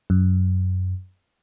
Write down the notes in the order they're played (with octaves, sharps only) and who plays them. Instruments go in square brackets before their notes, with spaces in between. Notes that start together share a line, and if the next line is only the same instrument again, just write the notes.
[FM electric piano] F#2